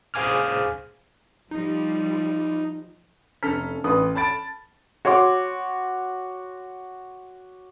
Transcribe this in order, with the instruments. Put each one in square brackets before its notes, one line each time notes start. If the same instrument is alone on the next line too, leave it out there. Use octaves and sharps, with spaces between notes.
[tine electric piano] G#4 C5 F5 G#5 D6 F6
[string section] F3 G3 [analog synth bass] D#4
[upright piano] F1 C#4 A4 A#5 F6 B6
A1 B4 D#6
A5 B5 A6 D7
[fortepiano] F#4 C#5 C6 D6